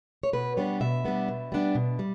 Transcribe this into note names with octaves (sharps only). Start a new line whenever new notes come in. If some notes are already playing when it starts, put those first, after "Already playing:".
C#5
B2 B4
G3 B3 D4 C#5
B2 E5
G3 B3 D4
B2
G3 B3 D4
B2
G3